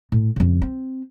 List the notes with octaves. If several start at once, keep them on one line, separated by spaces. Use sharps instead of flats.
A2
F2 C#3
C4